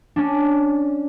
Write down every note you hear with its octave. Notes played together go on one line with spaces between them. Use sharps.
C#4 D4